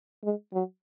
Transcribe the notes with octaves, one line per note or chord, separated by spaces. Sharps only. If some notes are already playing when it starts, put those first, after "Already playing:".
G#3
F#3